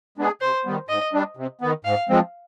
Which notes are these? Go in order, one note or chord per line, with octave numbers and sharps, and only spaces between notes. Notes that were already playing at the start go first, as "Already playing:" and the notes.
G#3 B3 D4 G#4
C3 C5
D#3 G3 B3
G#2 D#5
G3 D4
C3
D#3 B3
G#2 F5
F3 G#3 C4